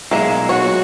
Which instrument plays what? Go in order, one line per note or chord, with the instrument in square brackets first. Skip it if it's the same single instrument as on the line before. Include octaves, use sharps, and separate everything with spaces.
[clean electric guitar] B1 A#2 G#3 [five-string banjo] A#3 E5
[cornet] F#4 [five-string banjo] C#5